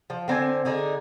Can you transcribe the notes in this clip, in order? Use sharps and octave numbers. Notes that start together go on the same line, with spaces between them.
F3
D3 C4 C5 G#5
D3 D#4 G#4